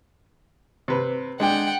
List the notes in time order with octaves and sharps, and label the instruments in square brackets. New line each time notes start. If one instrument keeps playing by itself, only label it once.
[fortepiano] C3 B4
[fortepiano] G#3 D4 [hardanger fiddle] F#5 G5